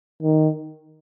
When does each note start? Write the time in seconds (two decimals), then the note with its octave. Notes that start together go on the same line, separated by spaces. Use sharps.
0.23 D#3